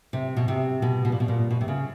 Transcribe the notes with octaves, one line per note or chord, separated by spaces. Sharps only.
C3
B2
C3
B2
B2
A#2
B2
A#2
B2
C3
C#3